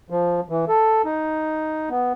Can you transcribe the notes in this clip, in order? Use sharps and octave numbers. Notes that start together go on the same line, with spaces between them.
F3
E3
A4
D#4
B3